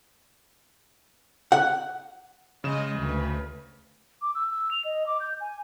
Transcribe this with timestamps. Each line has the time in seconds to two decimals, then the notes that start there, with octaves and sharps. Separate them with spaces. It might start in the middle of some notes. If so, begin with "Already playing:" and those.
1.52 F#5
2.64 C#3 G#3 D#5 E7
2.98 D2 B4
4.22 D6
4.35 E6
4.51 E6
4.71 F7
4.85 D#5
5.07 D6
5.20 G6
5.40 G#5